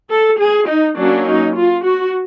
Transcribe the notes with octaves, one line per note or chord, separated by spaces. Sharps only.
A4
G#4
D#4
F#3 A#3 C#4 D4
D#4
F4
F#4